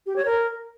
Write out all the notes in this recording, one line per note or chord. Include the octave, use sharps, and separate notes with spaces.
G4
C#5
A#4